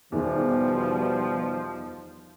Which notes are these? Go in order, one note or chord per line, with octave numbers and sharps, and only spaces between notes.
E2 B2 D#3 F3 G3